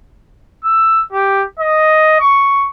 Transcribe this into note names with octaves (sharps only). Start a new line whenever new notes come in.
E6
G4
D#5
C#6